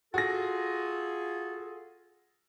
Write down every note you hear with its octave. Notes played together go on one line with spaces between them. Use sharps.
F4 F#4 G#4 A4 A#6